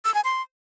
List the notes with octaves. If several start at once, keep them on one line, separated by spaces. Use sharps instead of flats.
E6
G#5
C6